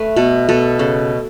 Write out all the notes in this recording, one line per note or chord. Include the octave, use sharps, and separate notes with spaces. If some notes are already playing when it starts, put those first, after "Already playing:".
Already playing: A3 B4
B2 A4
B2 A4
C#3 A4